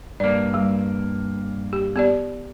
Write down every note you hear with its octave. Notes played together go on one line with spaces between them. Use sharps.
G2 A#3 D5
G3
G4
B3 G4 D5